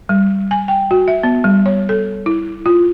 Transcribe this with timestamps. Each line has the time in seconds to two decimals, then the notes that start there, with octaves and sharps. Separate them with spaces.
0.09 G3
0.51 G#5
0.68 G5
0.91 F#4
1.08 E5
1.23 B3
1.44 G3
1.66 C#5
1.89 A4
2.26 E4
2.66 F4